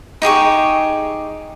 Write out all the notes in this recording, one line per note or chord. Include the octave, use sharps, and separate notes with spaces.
D#4 G4 G#4 C#6